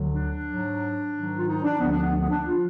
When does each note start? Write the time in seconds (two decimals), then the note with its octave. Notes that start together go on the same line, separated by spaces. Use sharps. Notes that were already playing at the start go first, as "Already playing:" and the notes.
Already playing: D2 D3 F#3
0.12 D4
0.45 G#2 F#3
1.12 G#2 D#3 F#3
1.37 F4
1.45 D#4
1.62 D4
1.78 D2 D3 F3 B3
1.90 D4
2.01 B3
2.20 B3
2.28 D4
2.45 F3 F4